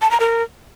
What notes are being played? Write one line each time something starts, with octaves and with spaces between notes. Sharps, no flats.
A5
A#5
A#4